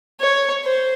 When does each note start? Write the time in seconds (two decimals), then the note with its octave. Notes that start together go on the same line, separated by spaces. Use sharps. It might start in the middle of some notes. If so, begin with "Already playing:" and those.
0.20 C#5
0.64 C5